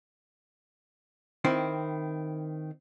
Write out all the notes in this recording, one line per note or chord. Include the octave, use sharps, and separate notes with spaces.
D#3 C4 E4